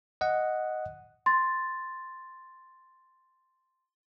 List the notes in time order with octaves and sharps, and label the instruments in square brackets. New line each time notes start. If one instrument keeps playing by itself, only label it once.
[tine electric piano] D#5 F#5
[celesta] C6 A6